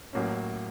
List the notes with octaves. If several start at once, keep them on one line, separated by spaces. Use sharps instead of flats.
A1 A2 F#3 A#3 C#4